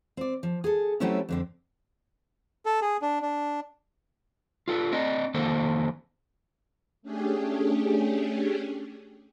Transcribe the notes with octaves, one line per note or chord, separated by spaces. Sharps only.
C4 D5
F3
G#4 A4
F#3 G3 A3 C4 C#4 E4
F2 D3 C4
A4
G#4
D4
D4
F4 A4 B4
C4 D5 D#5
F2 D#3 A#3 A4 C5
A3 C#4 D4 G4 G#4